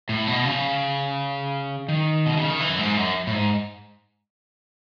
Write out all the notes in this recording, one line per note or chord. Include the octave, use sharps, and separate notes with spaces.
A2
B2
C#3
D#3
B2
C#3
D#3
E3
F#2
G#2
F#2
A2
G#2